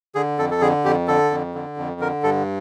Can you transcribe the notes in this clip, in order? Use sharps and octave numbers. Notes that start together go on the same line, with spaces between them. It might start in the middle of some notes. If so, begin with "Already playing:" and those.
D3 G#4
F2 A4
A4
D3 G#4
F2 G4
D3 A4
F2
D3
F2
D3 A#4
G2 A4